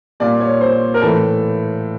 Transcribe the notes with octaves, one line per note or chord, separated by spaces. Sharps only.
A#2 G3 A#3 D5
C#5
C5
A#4
A2 E3 A3 A4